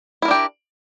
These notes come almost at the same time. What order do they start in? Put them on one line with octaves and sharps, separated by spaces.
E4 A#4 D4 G4